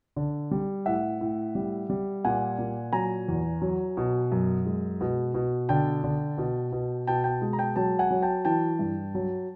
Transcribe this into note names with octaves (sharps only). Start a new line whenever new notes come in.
D3
G3
A2 E5 F#5
A2
G3
G3
A#2 F#5 G#5
A#2
F#3 G#5 A#5
E2
F#3
B2
F#2
G#3
B2
B2
D3 G5 A5
D3
B2
B2
B2 G5 A5
G5 A5
G#3
A#5
G5 A5
F#3 G5 A5
F#5 G#5
F#3
G5 A5
E3 G5 A5
G2
F#3